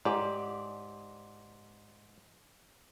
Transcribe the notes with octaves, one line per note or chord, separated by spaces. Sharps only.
G#2 G4 D5